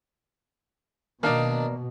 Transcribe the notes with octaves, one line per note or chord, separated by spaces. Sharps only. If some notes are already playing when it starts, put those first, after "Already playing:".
B2 D#3 A#3 D4 D#4 D5